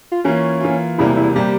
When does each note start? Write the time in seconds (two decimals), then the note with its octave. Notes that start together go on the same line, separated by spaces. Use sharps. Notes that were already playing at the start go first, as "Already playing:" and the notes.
0.12 F4
0.24 E3 A#3 C#4 F4
0.61 E3 A#3 F4
0.98 E1 E2 C3 G3 A#3 E4
1.17 E4
1.35 C3 G3 A#3 G4